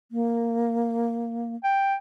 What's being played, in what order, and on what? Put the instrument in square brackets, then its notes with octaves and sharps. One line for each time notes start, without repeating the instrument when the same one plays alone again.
[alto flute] A#3
[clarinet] G5